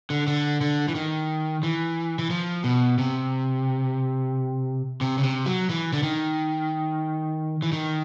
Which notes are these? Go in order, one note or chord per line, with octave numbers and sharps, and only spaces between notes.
D3
D3
D3
E3
D#3
E3
E3
F3
B2
C3
C3
C#3
C3
F#3
E3
D3
D#3
E3
D#3